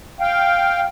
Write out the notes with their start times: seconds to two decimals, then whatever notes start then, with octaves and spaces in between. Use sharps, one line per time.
0.20 F5 G5